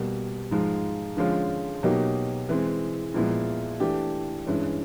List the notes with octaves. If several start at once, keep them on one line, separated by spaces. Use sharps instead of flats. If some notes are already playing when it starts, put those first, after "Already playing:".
Already playing: B2 G3 A#3
G#2 F3 G#3
D3 F3 G#3 C#4 F4
B2 F#3 A#3 D#4 G4
E3 G#3 C4
A#2 F3 G#3 B3 E4
E3 A3 D4 G4
G2 E3 G#3 C#4